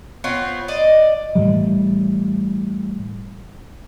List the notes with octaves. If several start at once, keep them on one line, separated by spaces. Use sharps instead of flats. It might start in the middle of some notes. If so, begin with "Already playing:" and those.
B3 C4 F4 C#5
D5 D#5
A2 E3 G3